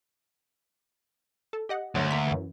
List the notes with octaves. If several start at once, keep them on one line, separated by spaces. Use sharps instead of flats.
A4
G4 D#5 F#5
D2 G2 F#3 A3
A#3 A#5 B6
F#2 E3